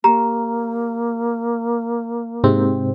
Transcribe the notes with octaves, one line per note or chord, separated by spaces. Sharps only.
A#3 G4 A#5
G#2 C3 C4